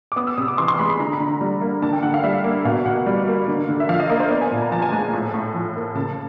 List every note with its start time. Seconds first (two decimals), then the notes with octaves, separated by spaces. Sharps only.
0.12 D6
0.16 B3 D#6
0.27 E6
0.38 C3 D#6
0.48 D6
0.58 E3 C6
0.68 C6
0.79 G#3 B5
0.89 B5
1.00 D3 A#5
1.13 B5
1.20 D3
1.27 A#5
1.41 G3
1.61 A#3
1.82 D3 A5
1.93 G5
2.03 D3 F#5
2.14 F5
2.24 G3 E5
2.44 A#3
2.65 B2 F5
2.86 B2 F#5
3.06 G3
3.28 A#3
3.48 D3
3.69 D3
3.80 E5
3.89 F3 F5
4.00 D#5
4.09 A#3 A#4
4.20 C5
4.30 B3 D5
4.41 G#5
4.51 A#2 A5
4.62 A#5
4.72 F3 A5
4.82 G#5
4.92 G#3 A5
5.02 A5
5.13 A2
5.34 A2
5.54 F3
5.76 A#3
5.95 C#3 A5